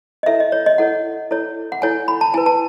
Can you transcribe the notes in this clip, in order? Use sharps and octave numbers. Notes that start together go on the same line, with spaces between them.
D#5
E4 A4 C#5 E5
D#5
C#5
D#5
E4 A4 C#5 F#5
E4 A4 C#5
F#5
E4 A4 C#5 G#5
B5
A5
E4 B4 G#5
A5